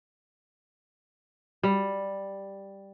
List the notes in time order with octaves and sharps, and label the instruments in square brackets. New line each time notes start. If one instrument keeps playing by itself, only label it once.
[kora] G3